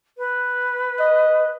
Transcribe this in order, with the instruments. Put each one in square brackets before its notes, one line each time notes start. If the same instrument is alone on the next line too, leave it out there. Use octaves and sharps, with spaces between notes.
[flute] B4
[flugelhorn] D#5